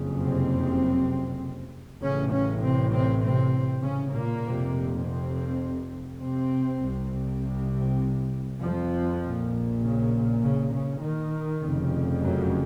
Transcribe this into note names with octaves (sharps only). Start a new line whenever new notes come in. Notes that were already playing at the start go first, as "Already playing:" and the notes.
Already playing: F#1 F2 C#3
C3 C4
A1 A2 C#3 C#4
C#3 C#4
C3 C4
C3 C4
C3 C4
C#3 C#4
A#2 A#3
F1 F2 C3
C3 C4
C3 C4
C2 C3
F2 F3
A#1 A#2
C#3
C#3
C#3
D#3
F1 F2 C#3
F#2 F#3